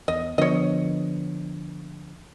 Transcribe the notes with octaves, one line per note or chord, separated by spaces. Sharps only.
E2 D#5
D3 F3 B3 C#5 D#5